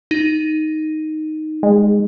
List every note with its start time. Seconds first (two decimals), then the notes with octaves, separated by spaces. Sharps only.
0.11 D#4
1.63 G#3